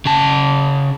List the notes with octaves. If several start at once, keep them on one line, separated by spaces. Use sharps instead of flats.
C#3 A5